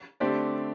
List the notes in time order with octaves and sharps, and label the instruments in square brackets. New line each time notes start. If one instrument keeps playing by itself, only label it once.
[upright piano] D3 A3 C4 G4 D5